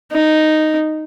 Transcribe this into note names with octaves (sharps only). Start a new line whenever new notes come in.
D#4